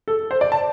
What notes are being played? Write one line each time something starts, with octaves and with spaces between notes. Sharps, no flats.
A4
C5
D5
A5